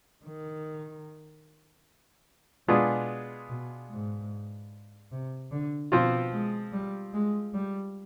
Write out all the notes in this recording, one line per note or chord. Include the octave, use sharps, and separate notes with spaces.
D#3
B2 G#3 B3 D4 F4 G#4
B2
G#2
C3
D3
B2 F3 C4 F4
G#3
G3
G#3
G3